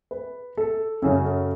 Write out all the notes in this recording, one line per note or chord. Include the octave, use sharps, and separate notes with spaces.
B4
A4
F#2 C#3 F#3 G#4
A4